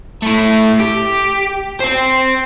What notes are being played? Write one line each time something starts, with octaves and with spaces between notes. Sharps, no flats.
A3 E4
G4
C5 G5